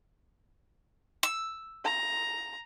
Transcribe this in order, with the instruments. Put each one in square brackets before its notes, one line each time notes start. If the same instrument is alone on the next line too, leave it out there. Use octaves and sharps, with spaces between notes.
[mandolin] E6
[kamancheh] A#5